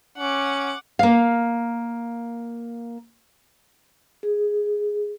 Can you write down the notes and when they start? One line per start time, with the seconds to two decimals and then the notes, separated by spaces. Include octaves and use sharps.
0.18 C#4 F#5 D6
0.99 A#3 F5
4.23 G#4